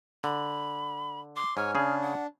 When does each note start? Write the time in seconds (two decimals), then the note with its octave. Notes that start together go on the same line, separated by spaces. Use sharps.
0.24 D3 B5
1.36 C6 D6
1.57 G#2 C#5 G#5 F6
1.75 C#3 D4 G#4
2.02 F#5